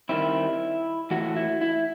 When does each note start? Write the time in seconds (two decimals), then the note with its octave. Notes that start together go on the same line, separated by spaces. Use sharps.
0.09 D#3 G3 C4 E4
1.11 A2 E3 A3 E4 F#4
1.36 E4
1.61 E4